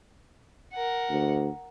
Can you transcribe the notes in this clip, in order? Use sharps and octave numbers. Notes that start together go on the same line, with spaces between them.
A#4 F#5
D2